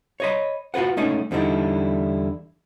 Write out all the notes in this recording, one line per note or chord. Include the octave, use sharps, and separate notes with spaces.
C#5 D#5 B5
F4 F#4 A4 B4 F#5
G#3 A3 C#4 D#4 G#4
E2 D3 G3 D#4 E4